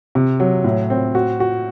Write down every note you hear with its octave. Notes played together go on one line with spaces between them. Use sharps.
C3
F#3
A2
C4
F#4
F#4